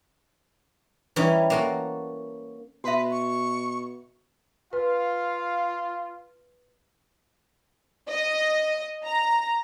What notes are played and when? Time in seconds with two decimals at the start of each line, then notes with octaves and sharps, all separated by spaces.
1.16 E3 G3 C#4 D#4
1.50 A#3 F#4 A4
2.84 B2 F#4 B4 E5
3.11 C#6
4.73 F4 B4 F5
8.10 D#5
9.04 A#5